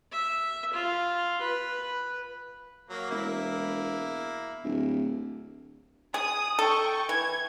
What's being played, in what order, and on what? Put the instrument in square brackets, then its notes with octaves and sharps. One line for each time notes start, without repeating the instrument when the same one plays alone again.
[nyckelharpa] E5
F4
B4
[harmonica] F#3 A#3
[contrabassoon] E1 [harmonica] A#3 E4
[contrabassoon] D1
[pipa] G#4 [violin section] D#6
[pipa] A4 [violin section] G5 C#6
[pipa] E3 [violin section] G#6